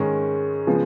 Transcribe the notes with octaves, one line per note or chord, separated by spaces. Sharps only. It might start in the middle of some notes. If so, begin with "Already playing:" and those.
Already playing: G#2 D#3 G#3 C#4
C#3 F3 G#3 B3